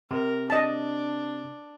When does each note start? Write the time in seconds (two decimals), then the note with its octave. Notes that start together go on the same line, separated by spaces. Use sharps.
0.11 C3 A#4
0.50 D4 D#5 A5